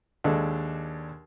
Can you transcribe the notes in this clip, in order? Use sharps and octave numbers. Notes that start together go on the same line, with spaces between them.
D#2 G#3 D4 A4